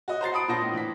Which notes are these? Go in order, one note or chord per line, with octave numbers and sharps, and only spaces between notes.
F#4 D#5
C5 A#5 A6 C7
F#5 A5 B5 D#6 D7
A#2 D4 C5 A5 A#6
A2
E3 B6